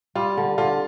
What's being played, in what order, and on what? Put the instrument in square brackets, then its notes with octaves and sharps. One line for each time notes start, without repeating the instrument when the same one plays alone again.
[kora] G3 [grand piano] F4
[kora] D3
[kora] D3 [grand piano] F4